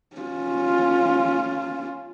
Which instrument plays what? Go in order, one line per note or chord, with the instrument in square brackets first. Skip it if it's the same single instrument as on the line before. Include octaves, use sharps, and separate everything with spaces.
[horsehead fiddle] C#4 F4